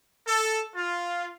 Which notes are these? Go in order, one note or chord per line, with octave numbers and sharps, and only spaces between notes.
A4
F4